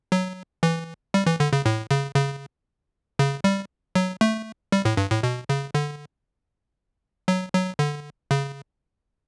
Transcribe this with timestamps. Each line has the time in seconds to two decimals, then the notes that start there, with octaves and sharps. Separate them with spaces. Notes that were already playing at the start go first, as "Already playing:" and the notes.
0.12 F#3
0.63 E3
1.14 G3
1.26 E3
1.40 D3
1.53 C#3
1.66 A2
1.91 C#3
2.16 C#3
3.19 C#3
3.44 G3
3.95 F#3
4.21 A3
4.72 G3
4.85 A2
4.97 G2
5.11 A2
5.23 B2
5.49 C#3
5.75 D3
7.28 F#3
7.54 F#3
7.79 D3
8.31 C#3